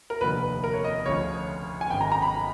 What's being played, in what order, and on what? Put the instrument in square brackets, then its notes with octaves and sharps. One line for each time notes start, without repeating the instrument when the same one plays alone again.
[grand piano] A#4
F1 D#2 D3 F3 B4
A#4
C#5
D#5
D2 C#3 F3 C#5
G#5
G#1 F#2 D#3 G5
A#5
A#5
B5